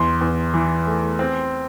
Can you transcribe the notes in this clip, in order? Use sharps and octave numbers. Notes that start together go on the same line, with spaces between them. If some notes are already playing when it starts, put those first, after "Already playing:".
Already playing: E2 C6
E2
E3
A3
C4